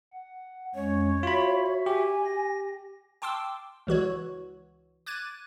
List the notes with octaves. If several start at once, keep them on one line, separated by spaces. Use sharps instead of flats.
F#5
F2 G#3 C#4 C#5
F4 F#4 E5 B5
G4 G#5
A#6
G5 A5 C6 D6 E6
C#2 E3 F#4 C#5
D6 F#6 G#6 A6 D#7